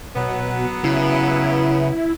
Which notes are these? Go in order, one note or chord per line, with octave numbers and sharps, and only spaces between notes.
B2 F#3 B3
C#3 E4